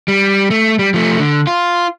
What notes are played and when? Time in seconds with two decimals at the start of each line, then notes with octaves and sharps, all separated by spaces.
0.08 G3
0.50 A3
0.79 G3
0.94 F3 A3
1.19 D3
1.47 F4